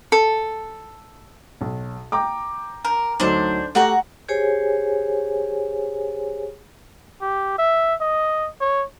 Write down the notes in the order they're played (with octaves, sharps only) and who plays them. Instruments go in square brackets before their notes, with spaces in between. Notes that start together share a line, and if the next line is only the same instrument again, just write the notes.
[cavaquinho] A4
[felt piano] B1
G5 A#5 D6
[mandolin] A#4
[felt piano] D2 F#3 D#4 [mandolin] D4 C5
[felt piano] A3 G4 [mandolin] F#4 F#5 A#5
[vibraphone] G4 G#4 C5 C#5 G#5
[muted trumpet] G4
E5
D#5
C#5